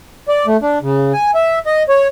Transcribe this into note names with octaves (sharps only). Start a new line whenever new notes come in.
D5
A3
D4
C#3
G#5
E5
D#5
C#5